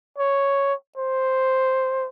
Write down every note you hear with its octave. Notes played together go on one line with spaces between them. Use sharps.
C#5
C5